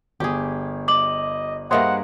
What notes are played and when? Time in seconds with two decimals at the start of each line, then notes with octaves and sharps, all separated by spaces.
0.20 G1 G4 G#4
0.88 D#5 D6 F#7
1.71 G2 A#3 G#4 C5 D#5 E5 F#5 C6